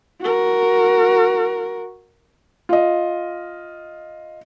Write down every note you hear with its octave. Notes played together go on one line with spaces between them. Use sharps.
F#4 A#4
F4 D#5